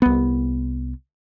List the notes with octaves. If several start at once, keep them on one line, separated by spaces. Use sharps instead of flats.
C2 B3